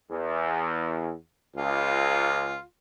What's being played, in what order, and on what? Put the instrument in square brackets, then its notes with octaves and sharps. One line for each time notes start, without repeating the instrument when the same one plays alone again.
[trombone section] E2
[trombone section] C#2 [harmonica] F4